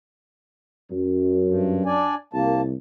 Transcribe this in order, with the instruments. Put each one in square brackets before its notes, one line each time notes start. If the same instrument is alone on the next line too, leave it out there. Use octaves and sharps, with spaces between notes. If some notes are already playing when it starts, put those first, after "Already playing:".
[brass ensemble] F#2
[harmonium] G2
D4 D5 G#5
[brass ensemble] C2 [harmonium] A#3 A5